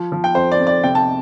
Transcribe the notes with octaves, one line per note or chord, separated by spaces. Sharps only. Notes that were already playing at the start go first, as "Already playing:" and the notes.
Already playing: F3
F3
G5
F2 C5
D5
F2
D5
C3 G5
A5